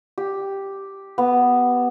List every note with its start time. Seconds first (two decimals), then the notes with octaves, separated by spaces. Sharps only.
0.18 G4
1.18 B3